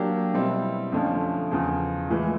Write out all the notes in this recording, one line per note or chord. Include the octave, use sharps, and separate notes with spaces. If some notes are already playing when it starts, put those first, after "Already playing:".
Already playing: F#3 A#3 D4 G4
B2 G3 C4 E4
F2 D3 F3 A3 C#4
E2 C#3 F3
A2 E3 G#3